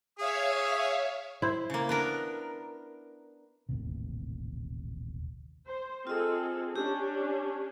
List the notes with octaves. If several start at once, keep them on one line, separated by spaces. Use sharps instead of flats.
G#4 C#5 E5 F5 D#6
E4 C5
C#3 A#3
B3 D4 A#4
D#1 A1 D#2 C3
C5
C4 F4 G#4 A4 D#5
C#4 D4 G4